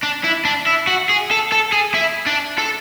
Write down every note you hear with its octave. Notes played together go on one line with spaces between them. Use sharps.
D4
E4
D4
E4
F#4
G#4
A4
A4
G#4
E4
D4
A4